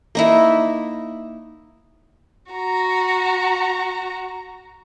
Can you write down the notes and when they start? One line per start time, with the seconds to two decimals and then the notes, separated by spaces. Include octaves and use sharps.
0.15 A#3 D#4 E4
2.52 F#4 A#5